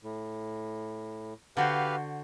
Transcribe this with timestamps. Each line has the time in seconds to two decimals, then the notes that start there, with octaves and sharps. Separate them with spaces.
0.03 A2
1.57 D3 F#4 G4 B4 C5 F5